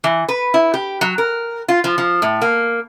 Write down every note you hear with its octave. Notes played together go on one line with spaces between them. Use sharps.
E3
B4
E4
G4
F#3
A#4
F4
F3
F3
A2
A#3